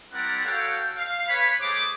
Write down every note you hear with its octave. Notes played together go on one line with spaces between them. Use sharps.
G3 C4 E4 A#4 D5 F#5
F#4 A4 C#5 F5 G5
F5
B4 C#5 B5
A3 G#4 C5 C#5 D6